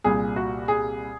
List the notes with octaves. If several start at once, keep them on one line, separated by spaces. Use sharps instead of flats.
C2 A#2 G3 G#4
F#4
G#4